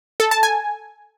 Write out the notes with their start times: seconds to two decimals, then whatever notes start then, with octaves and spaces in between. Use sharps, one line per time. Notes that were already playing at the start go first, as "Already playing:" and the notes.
0.20 A4
0.31 A5
0.43 G#5